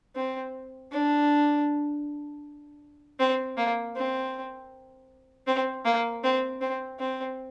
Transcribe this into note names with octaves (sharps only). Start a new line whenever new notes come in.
C4
D4
C4
A#3
C4
C4
A#3
C4
C4
C4